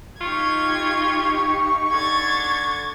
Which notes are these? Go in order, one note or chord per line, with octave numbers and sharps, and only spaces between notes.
D#4 F4 G4 F5 C#6 G#6
D3 G#6 A6